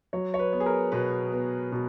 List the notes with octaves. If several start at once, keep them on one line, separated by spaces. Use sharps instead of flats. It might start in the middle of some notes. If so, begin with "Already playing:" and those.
F#3 C#5
C#5
B4
B3
G#4
A#4
B2 B4
B3
B2